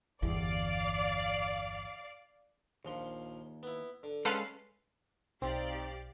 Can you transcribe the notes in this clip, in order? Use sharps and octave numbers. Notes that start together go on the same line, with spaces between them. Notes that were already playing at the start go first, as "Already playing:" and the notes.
G1 E2 D5 F5
A#1 D#2 F3 C6
B3 E4
D3
G#3 C#4 A4 B4 F5 C6
B1 C4 D#4 G4 D5 F5